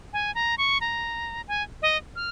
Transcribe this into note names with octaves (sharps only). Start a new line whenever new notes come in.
G#5
A#5
C#6
A#5
G#5
D#5
F6